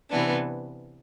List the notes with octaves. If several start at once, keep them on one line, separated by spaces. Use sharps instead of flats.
C3 E3 B3 D4